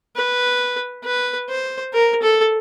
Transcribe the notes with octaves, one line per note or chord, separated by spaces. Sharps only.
B4
B4
C5
A#4
A4